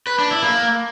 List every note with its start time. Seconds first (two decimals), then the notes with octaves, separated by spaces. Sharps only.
0.07 B4
0.19 D4
0.31 E4
0.42 A#3